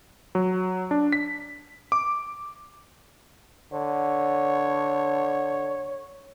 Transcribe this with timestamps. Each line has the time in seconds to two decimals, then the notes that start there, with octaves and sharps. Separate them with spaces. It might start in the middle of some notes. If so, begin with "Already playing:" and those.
0.35 F#3
0.91 D4
1.13 B6
1.92 D6
3.73 D3 C#5